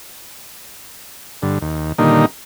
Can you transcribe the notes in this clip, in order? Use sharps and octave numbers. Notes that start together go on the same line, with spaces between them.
G2 D3
D#2
A#2 D3 D#3 G3 A#3 D#4